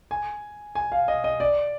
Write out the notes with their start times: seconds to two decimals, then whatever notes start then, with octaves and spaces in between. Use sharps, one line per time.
0.11 G#5
0.75 G#5
0.92 F5
1.08 D#5
1.24 D#5
1.40 D5